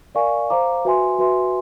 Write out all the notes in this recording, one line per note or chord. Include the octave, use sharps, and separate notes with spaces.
A#4 D5 F5 G#5 C#6
C5 F5 A#5 D6
F#4 B4 E5 G#5 C6
F#4 B4 E5 G#5 C6